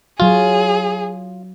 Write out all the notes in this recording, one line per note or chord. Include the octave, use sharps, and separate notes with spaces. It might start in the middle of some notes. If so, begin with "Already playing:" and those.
F#3 F4 F#4 G#4